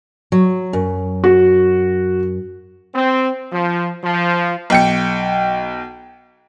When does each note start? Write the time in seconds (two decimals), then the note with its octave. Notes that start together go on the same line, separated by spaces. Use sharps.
0.32 F#3
0.73 F#2
1.24 F#4
2.95 C4
3.52 F3
4.03 F3
4.70 B1 G5 C#7